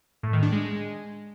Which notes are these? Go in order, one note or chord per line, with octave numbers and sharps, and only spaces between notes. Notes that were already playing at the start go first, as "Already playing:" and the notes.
A2
D#3
D4
G#3